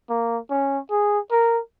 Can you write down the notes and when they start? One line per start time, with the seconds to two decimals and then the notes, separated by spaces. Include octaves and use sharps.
0.09 A#3
0.50 C#4
0.90 G#4
1.31 A#4